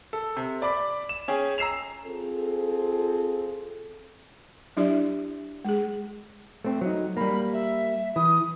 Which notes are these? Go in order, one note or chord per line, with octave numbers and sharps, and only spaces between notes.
A4
C3
D5 B5 D6 B6
E7
C#4 G#4 G5
A#5 E6 C7 E7 F7
C4 F4 G#4 A4
F#3 D4 E4 G4 D5 E5
G#3 G#4
A3 C4
F#3 D#4
G3 A#3 B5
E5
E3 D#6